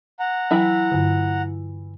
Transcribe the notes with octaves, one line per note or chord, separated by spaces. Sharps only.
F#5 A#5
E3 F#3 E4 G5 B5
G2 D3